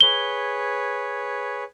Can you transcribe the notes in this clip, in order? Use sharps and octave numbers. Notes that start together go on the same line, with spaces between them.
G#4 B4 C#5 G7